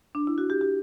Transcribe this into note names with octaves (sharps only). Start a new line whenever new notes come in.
D4
E4
F#4
G4
G4